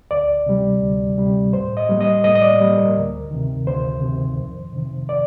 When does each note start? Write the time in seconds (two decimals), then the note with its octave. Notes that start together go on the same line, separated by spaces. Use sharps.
0.11 D2 D5
0.46 C3 G3
0.82 D2
1.18 C3 G3
1.53 A2 C5
1.77 D#5
1.89 G3 A#3
2.00 D#5
2.24 A2 D#5
2.35 D#5
2.42 D5
2.60 G3 A#3
2.78 A#4
2.95 D2
3.31 C3 D#3
3.67 D2 C5
4.02 C3 D#3
4.38 F2
4.73 C3 D#3
5.09 D5